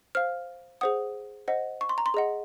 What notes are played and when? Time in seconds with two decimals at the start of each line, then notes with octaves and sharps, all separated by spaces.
0.15 C5 F5 F6
0.81 G#4 C5 F#5 D#6
1.48 C5 D#5 F#5
1.81 C#6
1.89 C6
1.98 A#5
2.06 C6
2.14 G#4 D#5 F#5